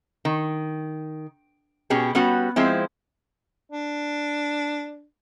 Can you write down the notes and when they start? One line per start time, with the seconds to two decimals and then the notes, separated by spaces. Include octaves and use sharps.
0.25 D#3
1.90 B2 C#4 G4 G#4
2.15 G3 B3 C#4 F#4
2.56 F3 G#3 C4 E4
3.70 D4